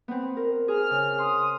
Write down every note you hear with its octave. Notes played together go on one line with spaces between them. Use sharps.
B3 C4
A#4
G#4 F6
C#3
C6 D#6